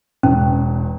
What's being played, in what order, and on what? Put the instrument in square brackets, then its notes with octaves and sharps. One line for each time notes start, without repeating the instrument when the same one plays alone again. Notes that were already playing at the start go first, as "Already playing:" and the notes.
[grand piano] E1 E2 [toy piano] C#4